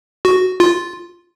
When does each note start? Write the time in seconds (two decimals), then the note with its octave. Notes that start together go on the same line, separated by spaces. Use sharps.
0.25 F#4
0.60 F4